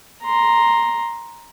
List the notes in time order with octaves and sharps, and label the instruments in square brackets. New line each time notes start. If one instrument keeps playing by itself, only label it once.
[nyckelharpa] A#5 C6